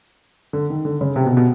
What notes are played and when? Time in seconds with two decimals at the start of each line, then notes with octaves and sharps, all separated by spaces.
0.53 D3
0.70 D#3
0.85 D3
1.01 C#3
1.16 C3
1.26 B2
1.37 B2